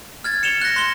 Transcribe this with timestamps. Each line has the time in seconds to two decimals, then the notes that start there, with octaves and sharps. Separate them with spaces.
0.24 F6 G#6 A6
0.43 C#7 E7 F7 G7
0.62 F#6 A#6
0.76 C6 A#6 G7